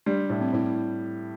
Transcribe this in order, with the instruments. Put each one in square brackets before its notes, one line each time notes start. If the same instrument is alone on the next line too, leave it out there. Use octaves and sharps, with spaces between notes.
[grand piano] G3 [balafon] D4
[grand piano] A2
[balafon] C4
[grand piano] A2 [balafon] E4